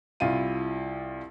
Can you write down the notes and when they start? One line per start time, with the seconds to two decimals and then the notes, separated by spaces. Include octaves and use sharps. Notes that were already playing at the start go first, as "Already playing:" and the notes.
0.20 C2 E4 F4 D#7